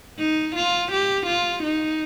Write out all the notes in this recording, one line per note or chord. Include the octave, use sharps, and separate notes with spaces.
D#4
F4
G4
F4
D#4